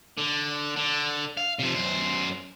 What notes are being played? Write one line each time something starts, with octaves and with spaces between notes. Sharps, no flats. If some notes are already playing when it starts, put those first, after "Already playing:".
D3
D3
F5
C3 F3
F#2 C5